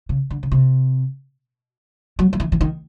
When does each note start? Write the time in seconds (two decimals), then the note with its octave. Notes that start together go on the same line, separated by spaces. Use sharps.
0.09 C#3
0.30 D3
0.43 C#3
0.52 C3
2.19 F#3
2.33 F3
2.40 E3
2.52 E3
2.61 D#3